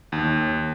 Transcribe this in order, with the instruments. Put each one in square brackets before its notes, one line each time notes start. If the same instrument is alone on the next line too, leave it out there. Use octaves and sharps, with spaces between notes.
[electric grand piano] D#2